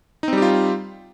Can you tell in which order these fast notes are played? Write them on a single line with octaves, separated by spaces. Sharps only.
D#4 C4 G3 G4 F4